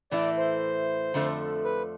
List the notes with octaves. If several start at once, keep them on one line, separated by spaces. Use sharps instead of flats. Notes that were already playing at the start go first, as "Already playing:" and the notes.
A2 E3 A3 E4 D5
C5
F2 D3 F3 A3
B4